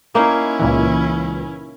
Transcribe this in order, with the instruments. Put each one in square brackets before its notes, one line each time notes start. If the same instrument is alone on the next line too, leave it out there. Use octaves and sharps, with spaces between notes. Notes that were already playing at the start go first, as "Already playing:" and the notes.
[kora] A#3 D#4 F5 [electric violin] C#4 E4
[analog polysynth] C#2 A#2 E3